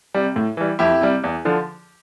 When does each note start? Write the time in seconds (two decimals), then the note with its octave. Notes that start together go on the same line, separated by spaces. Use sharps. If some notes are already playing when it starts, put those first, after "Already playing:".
0.14 C3 G3
0.36 A2
0.57 E3 G3
0.79 F2 E4 G4
1.01 C3 G3
1.24 E2
1.45 D3 F3